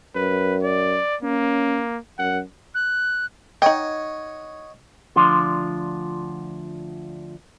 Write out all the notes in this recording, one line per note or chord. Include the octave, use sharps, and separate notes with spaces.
F#2 B4
D5
A#3 C#4
F#2 F#5
F#6
D#4 C#5 D#5 F#5 G5
D2 F3 D4 F4 C6